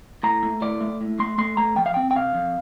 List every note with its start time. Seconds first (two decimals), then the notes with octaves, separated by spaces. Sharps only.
0.23 A2 A#5
0.43 A3
0.62 A2 D5
0.81 A3
1.01 A2
1.19 A3 C6
1.38 A3 C6
1.57 A3 A#5
1.76 F3 G5
1.86 F5
1.94 C4 G5
2.11 G5
2.16 C3 F5
2.34 F2